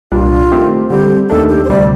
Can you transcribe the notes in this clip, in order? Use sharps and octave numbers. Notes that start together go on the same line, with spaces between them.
C2 A#2 G3 D4 F4
D#3 A3 C4 G4
D3 G3 C4 G4
D#2 D#3 A3 D4 A4
G4
C5
D2 C3 G3 C4 D5